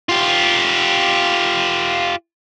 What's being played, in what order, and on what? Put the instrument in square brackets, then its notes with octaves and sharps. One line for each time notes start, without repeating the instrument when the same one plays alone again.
[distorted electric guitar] F4 G4